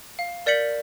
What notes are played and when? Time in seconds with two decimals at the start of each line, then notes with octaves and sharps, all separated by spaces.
0.19 F5
0.46 A#4 D5 G6 B6 C#7 F#7